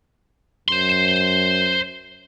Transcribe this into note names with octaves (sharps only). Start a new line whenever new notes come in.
F#2 C5 C6